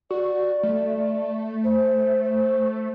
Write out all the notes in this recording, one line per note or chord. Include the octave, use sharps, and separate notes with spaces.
F#4 D5
A3
C5
C5